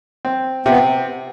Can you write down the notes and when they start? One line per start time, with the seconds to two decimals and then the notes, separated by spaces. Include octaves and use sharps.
0.25 C4
0.66 C3 B3